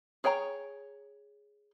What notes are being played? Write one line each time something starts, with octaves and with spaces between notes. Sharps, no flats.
G#4 C#5 G5 G#5 A#5